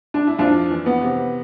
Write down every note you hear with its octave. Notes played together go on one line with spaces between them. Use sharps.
D4
E4
F2 D4 F4
E3
B3
C3